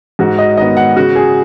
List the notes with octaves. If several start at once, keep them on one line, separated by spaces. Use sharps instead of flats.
G#2 F#4
D#5
D#3 B3 D#5
F#5
C#3 F#4
G#4